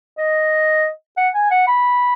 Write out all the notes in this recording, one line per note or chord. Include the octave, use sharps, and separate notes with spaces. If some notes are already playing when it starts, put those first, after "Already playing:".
D#5
F#5
G#5
F#5
B5